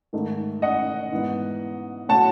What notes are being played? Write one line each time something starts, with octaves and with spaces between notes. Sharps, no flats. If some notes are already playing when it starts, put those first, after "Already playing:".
G#2 D#3 A3
D#5 F#5
G#2 E3 B3
A2 F#3 A3 F#5 A5